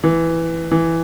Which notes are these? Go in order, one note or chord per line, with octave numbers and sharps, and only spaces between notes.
E3
E3